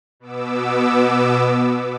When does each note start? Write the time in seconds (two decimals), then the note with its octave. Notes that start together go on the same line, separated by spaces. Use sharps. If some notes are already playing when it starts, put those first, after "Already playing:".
0.20 B2 B3 D6 E6